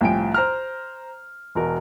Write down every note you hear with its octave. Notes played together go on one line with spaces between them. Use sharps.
C2 A2 F3 G5 G#5 D7
C5 A#5 F6
E1 F#4 A#4